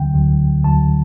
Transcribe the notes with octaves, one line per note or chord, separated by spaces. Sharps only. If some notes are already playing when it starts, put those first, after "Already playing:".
Already playing: D2 D3 F#3 G5
D2 D3 F#3
D2 D3 F#3 A5